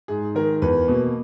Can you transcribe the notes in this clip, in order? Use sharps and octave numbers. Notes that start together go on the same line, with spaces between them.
G#2 G#4
D#3 G#3 A#4
E2 B4
B2 A#3